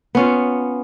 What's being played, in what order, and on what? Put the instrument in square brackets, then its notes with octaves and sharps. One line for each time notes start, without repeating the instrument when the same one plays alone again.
[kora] B3 C#4 F4